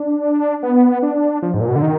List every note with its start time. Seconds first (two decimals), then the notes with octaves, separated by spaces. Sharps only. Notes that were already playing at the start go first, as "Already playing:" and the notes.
Already playing: D4
0.63 B3
1.03 D4
1.42 F3
1.54 G#2
1.61 A#2
1.68 B2
1.76 D3
1.82 D#3